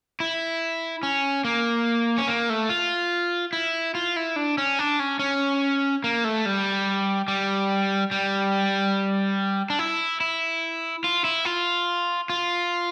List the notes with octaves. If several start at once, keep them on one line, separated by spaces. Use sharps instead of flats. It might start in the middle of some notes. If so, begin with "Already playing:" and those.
E4
C#4
A#3
C#4
A#3
A3
F4
E4
F4
E4
D4
C#4
D4
C#4
C#4
A#3
A3
G3
G3
G3
D4
E4
E4
F4
E4
F4
F4